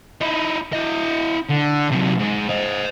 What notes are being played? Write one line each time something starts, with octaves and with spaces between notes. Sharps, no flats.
D#4 E4
E4 D#5
D3
C3 F#3
G#2
C5 D#5